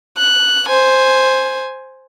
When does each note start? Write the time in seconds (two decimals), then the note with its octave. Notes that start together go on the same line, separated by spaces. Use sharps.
0.17 F#6
0.69 C5 G#5